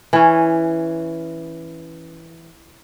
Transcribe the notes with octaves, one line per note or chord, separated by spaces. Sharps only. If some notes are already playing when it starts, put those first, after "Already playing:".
E3 C#4